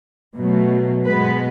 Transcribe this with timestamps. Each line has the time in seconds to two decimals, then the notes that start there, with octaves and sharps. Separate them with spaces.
0.35 B2 F#3 A3
1.04 B2 G#3 B3 B4